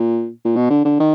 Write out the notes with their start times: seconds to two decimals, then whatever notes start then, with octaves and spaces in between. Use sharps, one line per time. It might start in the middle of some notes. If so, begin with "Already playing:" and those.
Already playing: A#2
0.45 A#2
0.56 B2
0.70 D3
0.85 D3
1.00 D#3